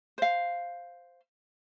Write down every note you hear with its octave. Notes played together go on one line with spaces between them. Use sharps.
C5 F5